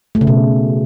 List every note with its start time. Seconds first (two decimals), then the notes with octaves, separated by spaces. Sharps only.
0.15 A3
0.21 C#3
0.27 B2